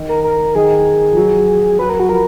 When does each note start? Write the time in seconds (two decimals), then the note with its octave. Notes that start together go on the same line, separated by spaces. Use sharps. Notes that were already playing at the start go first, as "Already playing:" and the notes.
Already playing: D#3
0.09 A#4
0.24 A#4
0.55 D#3 G#4
1.12 F3
1.17 F#3
1.79 F#3 B4
1.89 A#4
2.00 F#4
2.09 F3 A#4